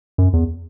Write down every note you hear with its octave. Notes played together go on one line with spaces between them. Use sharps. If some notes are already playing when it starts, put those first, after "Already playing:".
F#2
E2